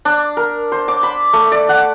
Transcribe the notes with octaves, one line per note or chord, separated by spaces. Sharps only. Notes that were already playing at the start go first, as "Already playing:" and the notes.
D4
A#4
C5
D6
B5
A3
D5
F#5